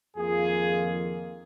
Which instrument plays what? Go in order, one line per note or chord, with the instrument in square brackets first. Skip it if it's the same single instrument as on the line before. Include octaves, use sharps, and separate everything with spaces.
[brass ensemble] F2 D#3 A#3 F4 G#4